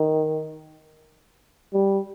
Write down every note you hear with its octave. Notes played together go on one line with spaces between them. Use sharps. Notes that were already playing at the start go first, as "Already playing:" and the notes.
Already playing: D#3
G3